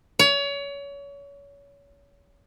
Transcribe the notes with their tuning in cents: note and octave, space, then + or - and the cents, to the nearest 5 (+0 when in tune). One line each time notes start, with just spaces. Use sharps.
C#5 +30